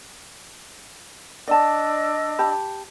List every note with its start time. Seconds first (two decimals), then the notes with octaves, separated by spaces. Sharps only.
1.48 D4 D5 D#5 A5 E6
2.39 G4 A5 B5